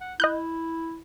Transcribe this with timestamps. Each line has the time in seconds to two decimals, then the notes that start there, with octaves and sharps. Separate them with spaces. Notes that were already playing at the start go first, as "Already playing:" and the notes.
0.01 F#5
0.20 E4 D#5 F#6 G6